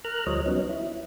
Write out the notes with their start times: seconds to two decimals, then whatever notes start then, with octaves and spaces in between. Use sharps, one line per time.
0.05 A#4 A#5 F6 F#6
0.27 D2 F3 G3 C5 C#5 D#5
0.46 F#3 B3 C#4 D#4
0.69 E4